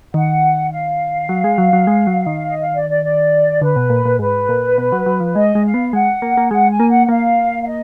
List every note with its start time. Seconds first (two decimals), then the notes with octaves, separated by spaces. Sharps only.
0.14 D#3 F#5
0.71 F5
1.29 F#3
1.44 G#3
1.58 F#3
1.73 F#3
1.87 G#3
2.07 F#3
2.27 D#3
2.45 D#5
2.59 F5
2.75 D5
2.89 D5
3.04 D5
3.61 D3 B4
3.76 B2
3.90 A#2
4.05 A#2
4.19 G#2 B4
4.49 A#2
4.78 B2
4.92 F#3
5.06 F#3
5.20 F3
5.35 G#3 D#5
5.55 G#3
5.64 F5
5.74 B3
5.93 G#3 F#5
6.22 A#3
6.37 A#3
6.51 G#3 F#5
6.71 G#5
6.80 A#3
6.90 F#5
7.05 F#5
7.09 A#3 F5
7.62 F5
7.67 D#5